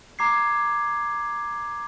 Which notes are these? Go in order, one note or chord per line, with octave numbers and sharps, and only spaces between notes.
A#5 D6 G#6 C7